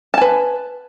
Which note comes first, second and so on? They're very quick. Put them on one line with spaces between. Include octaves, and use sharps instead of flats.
A5 G#5 B4